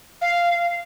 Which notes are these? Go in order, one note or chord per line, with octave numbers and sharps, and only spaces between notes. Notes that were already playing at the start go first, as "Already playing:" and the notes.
F5